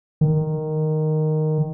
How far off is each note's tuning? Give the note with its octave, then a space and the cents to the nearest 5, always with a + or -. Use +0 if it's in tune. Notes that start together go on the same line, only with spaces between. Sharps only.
D#3 -5